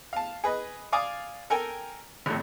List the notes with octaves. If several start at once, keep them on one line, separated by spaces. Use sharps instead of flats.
F5 A5
G#4 B4 D#5
D5 F5 G#5 D6 D#6
A4 A#4 G5 G#5 A#5
G#1 F2 A2